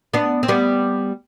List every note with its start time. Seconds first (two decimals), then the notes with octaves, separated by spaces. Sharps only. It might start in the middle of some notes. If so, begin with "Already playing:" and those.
0.14 B3 D4
0.43 C4
0.48 G3 B3